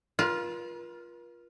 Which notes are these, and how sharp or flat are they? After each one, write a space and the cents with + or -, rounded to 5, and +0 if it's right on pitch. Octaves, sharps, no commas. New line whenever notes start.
F4 +0 A#4 +45